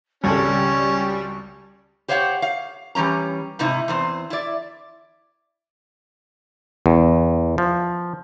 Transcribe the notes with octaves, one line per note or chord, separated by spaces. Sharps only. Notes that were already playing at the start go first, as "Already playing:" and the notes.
G#1 C#2 G3 C#4 A4 C#6
G4 C5 C#5 F5 F#5
F5
E3 G3 C#4 A#5
G#2 C3 D#4 E4
E2 C4 C5
E4 D5
E2
F3